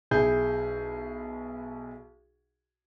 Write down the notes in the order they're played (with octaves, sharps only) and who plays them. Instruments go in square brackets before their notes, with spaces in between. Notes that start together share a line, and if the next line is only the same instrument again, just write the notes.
[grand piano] B1 E4 G#4 G6